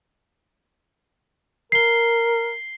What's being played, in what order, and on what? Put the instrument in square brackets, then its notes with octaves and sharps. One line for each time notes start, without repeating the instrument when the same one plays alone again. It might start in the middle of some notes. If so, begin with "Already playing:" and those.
[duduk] A#4 [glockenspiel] C7 G7